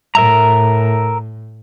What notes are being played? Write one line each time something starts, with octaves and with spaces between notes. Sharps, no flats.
A2 A#4 E5 A#5